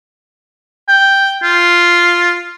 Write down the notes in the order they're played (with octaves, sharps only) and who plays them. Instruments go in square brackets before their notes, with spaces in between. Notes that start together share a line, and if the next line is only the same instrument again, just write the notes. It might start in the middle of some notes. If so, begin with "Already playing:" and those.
[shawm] G5
F4